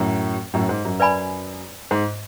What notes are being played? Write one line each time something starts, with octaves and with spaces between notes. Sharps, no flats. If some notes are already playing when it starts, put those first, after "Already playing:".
Already playing: F#2 A2
F#2 A2
G#2
F#2
B4 D5 G#5 B5
G#2